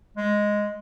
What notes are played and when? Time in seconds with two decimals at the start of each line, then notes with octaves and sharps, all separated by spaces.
0.17 G#3